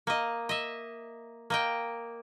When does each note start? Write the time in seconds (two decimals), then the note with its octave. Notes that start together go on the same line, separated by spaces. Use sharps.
0.07 A#3 D#5
0.49 D#5 E5
1.50 A#3 D#5 G5